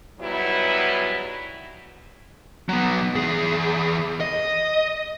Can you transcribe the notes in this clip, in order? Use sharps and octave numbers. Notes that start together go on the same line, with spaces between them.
G#2 F#3 G3 B3 E4
F#3 B3
E2 G#4
D#5